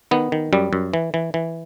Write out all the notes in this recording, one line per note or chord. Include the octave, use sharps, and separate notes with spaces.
D#3 B3
D#3
F#2 G3
F#2
E3
E3
E3